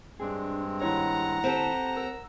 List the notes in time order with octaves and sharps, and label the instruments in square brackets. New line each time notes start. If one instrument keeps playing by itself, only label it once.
[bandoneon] G2 G#3 C4 [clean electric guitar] D4 G#4
[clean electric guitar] D#2 E4 C#5 [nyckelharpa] F#5 A#5
[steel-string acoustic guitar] C4 G4 A4
[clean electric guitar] A#4 [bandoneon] E6